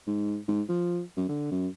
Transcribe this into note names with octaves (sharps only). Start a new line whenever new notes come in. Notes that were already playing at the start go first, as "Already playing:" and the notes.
G#2
G#2
F3
F#2
D3
F#2